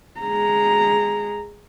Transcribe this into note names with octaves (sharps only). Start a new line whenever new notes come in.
G#3 A#5